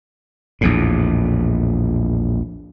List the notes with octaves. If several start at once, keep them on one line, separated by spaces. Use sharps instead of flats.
A#1 E2 A2